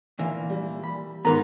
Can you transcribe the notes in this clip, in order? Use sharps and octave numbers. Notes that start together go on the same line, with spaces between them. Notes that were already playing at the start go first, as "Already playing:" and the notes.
A#2 E3 A#3
G3
B5
G#2 D#3 B3 A#4 A#5